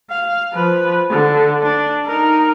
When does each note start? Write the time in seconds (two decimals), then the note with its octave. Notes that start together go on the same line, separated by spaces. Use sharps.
0.10 F5
0.53 F3 B4
1.10 D3
1.62 D4
2.06 D#4 A#4